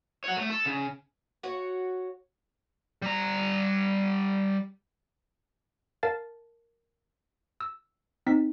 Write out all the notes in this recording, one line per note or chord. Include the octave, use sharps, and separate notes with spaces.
C#5 F#5
A3
A4
C#3
F#4 C#5
G3 A#5
A#4 F5 A5 A6
E6
C4 D#4 B6